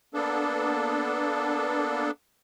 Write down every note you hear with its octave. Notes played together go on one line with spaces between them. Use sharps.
A#3 B3 D4 A4